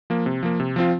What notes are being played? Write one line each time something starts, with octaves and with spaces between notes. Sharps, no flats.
F3 A#3
C3
F3 A#3
C3
F3 C4 F4